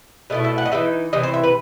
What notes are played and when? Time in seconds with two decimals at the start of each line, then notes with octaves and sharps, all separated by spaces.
0.30 B2 A3 E4 D#5
0.44 E5
0.58 F#5
0.65 D#5
0.72 E3 G3 D#4 E5
1.13 C3 E3 D#5
1.23 C5
1.34 E5
1.43 B4